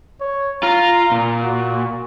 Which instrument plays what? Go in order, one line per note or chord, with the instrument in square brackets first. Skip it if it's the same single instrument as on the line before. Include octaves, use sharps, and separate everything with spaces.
[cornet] C#5
[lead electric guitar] F4 [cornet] A#5
[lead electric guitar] A#2
[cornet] F#4